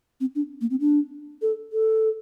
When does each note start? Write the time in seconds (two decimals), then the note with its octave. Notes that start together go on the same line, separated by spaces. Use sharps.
0.21 C4
0.35 D4
0.61 A#3
0.71 C4
0.80 D4
1.42 A4
1.73 A4